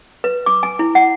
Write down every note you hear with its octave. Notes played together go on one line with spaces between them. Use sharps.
B4
D6
G#5
E4
F#5